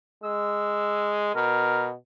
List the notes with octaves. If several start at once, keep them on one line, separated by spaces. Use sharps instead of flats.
G#3 E6
B2 A#4